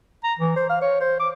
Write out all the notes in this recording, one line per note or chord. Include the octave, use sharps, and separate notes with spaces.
A#5
E3
C5
F5
C#5
C5
D6